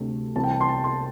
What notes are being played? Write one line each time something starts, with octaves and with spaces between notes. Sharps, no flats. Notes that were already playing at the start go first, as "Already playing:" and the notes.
Already playing: D2 C3 A3 D4
C2 C3 E3 C4 E4 A5
G5
A5
C6
A5
C6